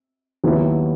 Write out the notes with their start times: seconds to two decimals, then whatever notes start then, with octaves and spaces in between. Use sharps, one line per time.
0.44 D#2 D#3 F#3 B3 E4